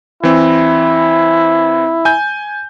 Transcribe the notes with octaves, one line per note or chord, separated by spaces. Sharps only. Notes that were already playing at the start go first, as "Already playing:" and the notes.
E3 C4 E4
G#5 G6